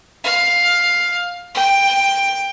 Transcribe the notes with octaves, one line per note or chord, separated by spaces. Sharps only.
F5
G5